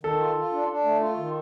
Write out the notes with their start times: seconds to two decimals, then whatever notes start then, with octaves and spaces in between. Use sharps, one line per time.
0.03 D#3 A4
0.20 F4
0.36 F4
0.52 D4
0.68 D4
0.84 A3
1.01 F4
1.17 D#3